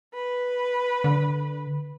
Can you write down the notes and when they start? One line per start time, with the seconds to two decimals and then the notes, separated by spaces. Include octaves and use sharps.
0.14 B4
1.04 D3